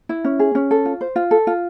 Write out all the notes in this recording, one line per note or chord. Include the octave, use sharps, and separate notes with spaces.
E4
C#4
G#4
C#4
A4
F4
C5
F4
A4
F4